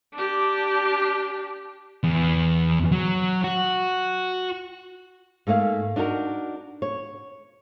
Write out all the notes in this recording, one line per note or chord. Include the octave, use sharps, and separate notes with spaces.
D4 G4
E2
F#3
F#4
G#2 A3 A#3 F5
D4 D#4 F#4 A#4
C#5